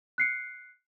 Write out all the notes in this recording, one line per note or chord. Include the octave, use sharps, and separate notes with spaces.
F#6 C7 C#7